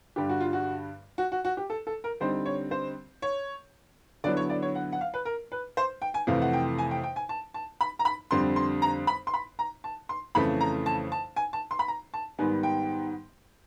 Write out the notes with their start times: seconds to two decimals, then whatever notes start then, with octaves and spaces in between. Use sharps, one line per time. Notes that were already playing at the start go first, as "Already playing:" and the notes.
0.16 G2 D3 G3 G4
0.29 F#4
0.40 F4
0.53 F#4
1.18 F#4
1.32 F#4
1.45 F#4
1.57 G4
1.70 A4
1.87 A4
2.04 A#4
2.20 D3 G3 C4 D#4 C5
2.46 C#5
2.71 C5
3.22 C#5
4.24 D3 F#3 B3 E4 D5
4.37 C#5
4.50 D5
4.62 C#5
4.75 F#5
4.92 F#5
5.01 F5
5.14 B4
5.25 A#4
5.52 B4
5.77 C5
6.02 G5
6.14 G#5
6.27 F2 C3 E3 A3 F5
6.42 F#5
6.53 G5
6.78 G#5
6.91 G5
7.04 G5
7.16 G#5
7.29 A5
7.54 A5
7.81 B5
7.99 A#5
8.05 B5
8.31 F2 D3 G3 C4 C6
8.56 C6
8.82 A#5
9.07 B5
9.27 C6
9.34 B5
9.59 A#5
9.84 A5
10.09 C6
10.35 F2 C#3 E3 A3 C#4 B5
10.61 A#5
10.86 A5
11.12 A5
11.36 G#5
11.53 A5
11.71 C6
11.79 B5
11.88 A#5
12.14 A5
12.38 G#2 D#3 G3 B3 G#5
12.63 G5